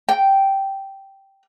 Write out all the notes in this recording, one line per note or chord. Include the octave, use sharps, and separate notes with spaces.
G5